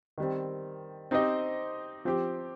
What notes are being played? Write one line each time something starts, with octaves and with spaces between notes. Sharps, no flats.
D#3 G3 C4
C4 D#4 G4 C5 D#5
F3 C4 G4